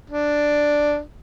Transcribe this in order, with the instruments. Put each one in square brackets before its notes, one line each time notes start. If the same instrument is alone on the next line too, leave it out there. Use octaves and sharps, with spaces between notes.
[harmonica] D4